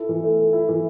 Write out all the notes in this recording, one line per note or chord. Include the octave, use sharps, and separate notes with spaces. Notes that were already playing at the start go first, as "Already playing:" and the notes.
Already playing: E4 A4
E3
A3
A4
E4
E3